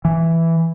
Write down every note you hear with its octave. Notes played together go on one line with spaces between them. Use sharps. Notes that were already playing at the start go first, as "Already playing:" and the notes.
E3